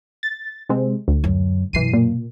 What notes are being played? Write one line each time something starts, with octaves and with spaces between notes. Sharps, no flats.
A6
C3 G#3 C4
D2
F#2
F#2 B2 E3 C7 D#7
A#2